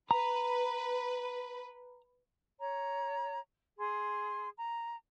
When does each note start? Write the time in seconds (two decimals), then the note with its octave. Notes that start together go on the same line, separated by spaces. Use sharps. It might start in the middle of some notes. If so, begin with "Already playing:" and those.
0.11 B4 A#5
2.58 C#5 A#5
3.78 G#4 C6
4.57 A#5